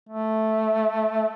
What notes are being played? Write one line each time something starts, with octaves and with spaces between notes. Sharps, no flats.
A3